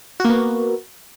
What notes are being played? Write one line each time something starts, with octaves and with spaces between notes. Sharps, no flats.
A#3 B3 F#4